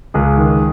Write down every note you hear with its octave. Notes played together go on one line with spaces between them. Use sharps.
C#2 G#3 G#4
D#3